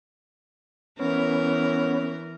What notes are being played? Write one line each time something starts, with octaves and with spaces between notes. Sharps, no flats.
E3 B3 C#4 A#4